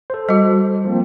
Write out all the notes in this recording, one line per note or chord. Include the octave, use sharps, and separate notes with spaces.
A4 C5
G3 F#4
F3 A#3 C4